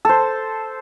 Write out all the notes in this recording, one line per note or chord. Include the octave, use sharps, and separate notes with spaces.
A4 C5